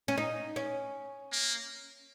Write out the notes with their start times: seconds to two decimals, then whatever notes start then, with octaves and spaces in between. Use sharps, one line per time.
0.08 C#4
0.18 D#4
0.56 C#4
1.32 A#3